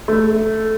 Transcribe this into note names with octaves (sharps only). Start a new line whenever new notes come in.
A3